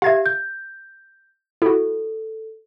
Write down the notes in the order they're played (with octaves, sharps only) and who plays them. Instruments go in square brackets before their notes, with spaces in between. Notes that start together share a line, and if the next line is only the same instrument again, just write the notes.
[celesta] G4 E5 [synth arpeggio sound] F5 G#6
[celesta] G6
[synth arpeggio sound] E4 F#4 [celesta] A4